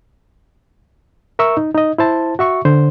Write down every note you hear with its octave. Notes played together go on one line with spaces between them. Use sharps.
A#4 E5 C#6 E6
D#4
D#4 D#5
E4 C5 A5
F#4 E5 C#6
D3 C5